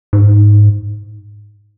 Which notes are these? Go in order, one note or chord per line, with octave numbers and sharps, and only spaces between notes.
G#2